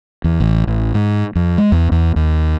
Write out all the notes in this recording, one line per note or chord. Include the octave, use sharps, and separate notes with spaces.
E2
A1
A1
G#2
F2
G#3
E2
E2
D#2